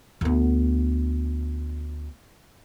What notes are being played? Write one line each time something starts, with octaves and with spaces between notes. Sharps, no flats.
D2 B3